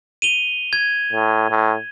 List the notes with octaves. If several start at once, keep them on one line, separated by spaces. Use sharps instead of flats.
D#7 F7 G7
G#6
A2
A2